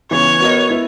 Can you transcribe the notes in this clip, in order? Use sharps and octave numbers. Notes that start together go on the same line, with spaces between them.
C#3 E3 B3 C#5
B3 F#4 A#4 D#5
B3 E4 B4